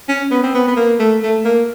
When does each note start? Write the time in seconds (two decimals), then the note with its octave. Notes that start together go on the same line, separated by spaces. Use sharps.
0.09 C#4
0.31 B3
0.44 C4
0.55 B3
0.68 B3
0.77 A#3
1.00 A3
1.23 A3
1.45 A#3